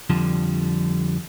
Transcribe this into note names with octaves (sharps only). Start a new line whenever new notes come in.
F2 D3 F3 G3